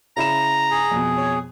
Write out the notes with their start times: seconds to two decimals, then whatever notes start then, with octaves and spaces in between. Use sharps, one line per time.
0.17 C#3 E4 A#5 E7
0.71 G#4
0.91 F2 B2
1.17 C#5